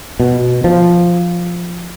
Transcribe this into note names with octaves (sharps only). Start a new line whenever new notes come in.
B2
F3